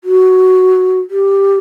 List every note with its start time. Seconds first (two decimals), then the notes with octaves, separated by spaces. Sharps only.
0.04 F#4
1.10 G4